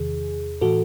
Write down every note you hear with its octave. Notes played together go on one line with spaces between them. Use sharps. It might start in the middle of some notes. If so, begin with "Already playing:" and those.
Already playing: E2 C3 D#3 G#4
A2 E3 F#4 A4